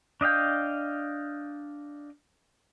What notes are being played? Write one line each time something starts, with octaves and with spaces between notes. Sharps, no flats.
D4 D#5 F5 G5